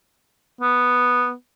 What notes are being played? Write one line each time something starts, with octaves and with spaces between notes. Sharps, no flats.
B3